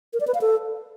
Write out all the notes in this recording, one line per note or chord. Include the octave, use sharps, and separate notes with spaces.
A#4
D5
B4
F5
A4